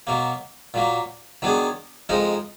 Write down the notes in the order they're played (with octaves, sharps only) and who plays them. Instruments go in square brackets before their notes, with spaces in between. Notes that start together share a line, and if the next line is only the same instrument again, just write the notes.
[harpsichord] B2 F#3 A#3
A#2 F#3 A#3
D#3 F#3 B3 D4 G#4
F2 F3 G#3 D#4 A#4